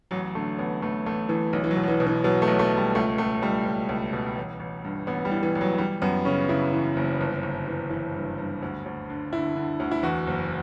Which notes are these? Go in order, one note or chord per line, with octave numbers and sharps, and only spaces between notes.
A1 F#3
D3 A3
A1 B3
A1 A3
A1 A3
A1 E3
B1 E3
E3
F#3
B2
F#3
E3
B2
E3
B2 F#3
A3
B1
A3
B1
G3
C#2 A3
C#2 A3
C#2 G3
C#2
C#2
B2
A1
A1
G2
A1 B3
G3
E3
E3
A1
F#3
E3 G3
F#2 B3
C#3 C#4
C#3 E4
E3
F#1
G1
G1
E3
E3
G2
G2
D2
D2
D3
D3 E4
D3
D2
E4
E2 F#4
F#1